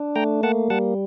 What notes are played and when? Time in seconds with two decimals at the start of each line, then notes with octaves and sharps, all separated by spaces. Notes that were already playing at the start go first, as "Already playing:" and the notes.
Already playing: D4
0.16 A3 G5 A#5
0.43 A#3 F#5 A5
0.70 G3 F#5 A5